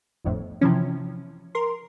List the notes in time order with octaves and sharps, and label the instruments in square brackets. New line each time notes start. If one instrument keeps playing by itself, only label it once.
[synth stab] G1 F2 A2
C3 E3 F3 C#4
A#4 C6